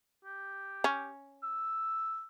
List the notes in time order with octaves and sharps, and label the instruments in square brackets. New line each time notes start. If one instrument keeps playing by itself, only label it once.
[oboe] G4
[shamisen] C#4
[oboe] E6